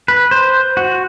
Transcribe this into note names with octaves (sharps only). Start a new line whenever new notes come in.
B4
C5
F#4